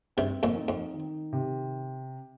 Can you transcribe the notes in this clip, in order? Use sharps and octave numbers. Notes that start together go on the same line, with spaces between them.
G2 C3 C4
F2 A#2
D#4
F2
D#3
C3